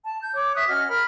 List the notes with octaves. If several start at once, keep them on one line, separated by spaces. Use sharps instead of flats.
A5
G6
C#5 D6
E5 C#6 D#6 F#6
C#4 F#4 D#5 F6
A#4 B5 F6